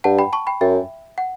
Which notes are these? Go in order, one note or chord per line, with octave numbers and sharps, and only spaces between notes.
G2 F#5 A5
G5 B5
A5 C#6
G5 B5
F#2 E5 G5
F#5